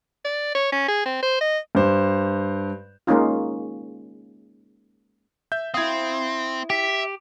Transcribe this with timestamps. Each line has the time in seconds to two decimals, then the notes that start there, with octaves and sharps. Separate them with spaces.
0.25 D5
0.55 C#5
0.72 C#4
0.88 G#4
1.06 C4
1.23 C5
1.41 D#5
1.75 G2 C5
3.07 G#3 A#3 C#4 D#4 F4
5.52 E5 G6
5.74 C4 E4 F5 D#6 G#6
6.70 G4 E5